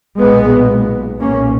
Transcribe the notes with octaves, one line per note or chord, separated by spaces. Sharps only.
B1 A#2 G#3 B3
B1 A#2 A#3 C#4